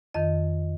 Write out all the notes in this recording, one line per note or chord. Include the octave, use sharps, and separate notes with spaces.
F2 D#3 D#5